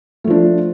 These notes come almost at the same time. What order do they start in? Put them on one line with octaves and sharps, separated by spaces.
A3 F3 D4